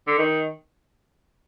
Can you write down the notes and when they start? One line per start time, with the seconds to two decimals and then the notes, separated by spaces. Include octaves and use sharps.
0.07 D3
0.18 D#3